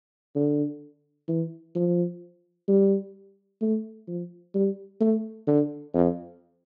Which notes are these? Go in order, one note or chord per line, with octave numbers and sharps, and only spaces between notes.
D3
E3
F3
G3
A3
F3
G3
A3
D3
F2